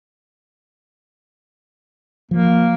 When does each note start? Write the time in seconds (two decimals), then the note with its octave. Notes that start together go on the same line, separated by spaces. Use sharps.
2.31 F3 A#3